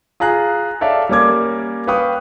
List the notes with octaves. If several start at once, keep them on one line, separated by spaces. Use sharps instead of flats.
F4 G#4 A#5 F#6
A4 C#5 D5 E5 F5
G3 A#3 C#4 A#4 D6 G#6
B4 F5 G5 C#6 D#6